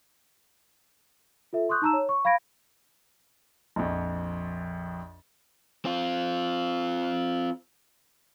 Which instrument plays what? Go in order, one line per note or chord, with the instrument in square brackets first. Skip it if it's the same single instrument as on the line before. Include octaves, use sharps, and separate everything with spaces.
[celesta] F4 A4 E5
C6 C#6 D#6 F#6 G6
D#4 A5 A#5 E6 E7
C#5
C#6
F5 B5 G#6 A#6 D7
[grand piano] A#1 F2
[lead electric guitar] C4 F4